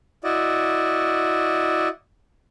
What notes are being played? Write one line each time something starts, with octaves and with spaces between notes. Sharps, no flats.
E4 F#4 D5 D#5